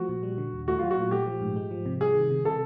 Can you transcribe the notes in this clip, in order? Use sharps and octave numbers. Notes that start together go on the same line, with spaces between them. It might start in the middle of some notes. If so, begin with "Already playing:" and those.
Already playing: F3 A3 F#4
A#2
G3
D3
D#2
A3 F#4
F#3 F4
F#4
A#2
A3 G4
F3
G#2
G#3
F3
C3
G3 G#4
D#3
C3
C3 A4